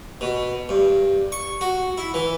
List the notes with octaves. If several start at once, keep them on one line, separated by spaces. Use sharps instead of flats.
B2
G2
C#6
F#4
E4
E3